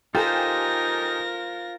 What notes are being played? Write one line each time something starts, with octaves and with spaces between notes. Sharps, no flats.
D#4 F4 G4 A4 A#4 C5 G#5 A#6